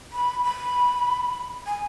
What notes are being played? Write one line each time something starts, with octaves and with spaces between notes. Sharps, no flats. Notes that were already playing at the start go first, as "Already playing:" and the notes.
B5
B5
G#5